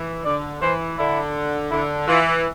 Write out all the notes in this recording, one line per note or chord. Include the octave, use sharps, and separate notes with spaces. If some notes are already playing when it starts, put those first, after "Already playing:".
Already playing: E3
D3 D5
E3 C5
D3 E4
D3 E4
E3 F4